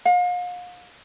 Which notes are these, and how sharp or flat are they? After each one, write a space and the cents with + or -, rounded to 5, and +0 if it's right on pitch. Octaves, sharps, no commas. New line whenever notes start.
F5 +40